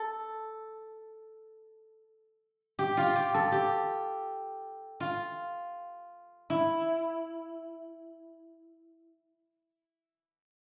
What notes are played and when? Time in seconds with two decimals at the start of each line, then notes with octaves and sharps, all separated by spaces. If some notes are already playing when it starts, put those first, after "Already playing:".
Already playing: A4
2.79 G4
2.97 F4
3.16 G4
3.34 A4
3.52 G4
5.00 F4
6.50 E4